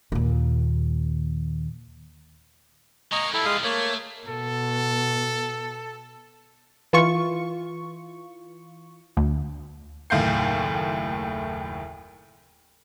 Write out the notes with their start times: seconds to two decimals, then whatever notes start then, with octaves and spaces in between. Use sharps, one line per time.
0.12 D#2 A#2
3.12 G#3 A#3 D#5 A#5 C#6
3.34 G3 E4 F4 A4
3.45 G#3 F5 D#6
3.64 A3 A#3 C#5
4.27 B2 A4
6.93 E3 F4 C#6
9.17 D2
10.10 F#1 D#2 A2 F5 G6 C7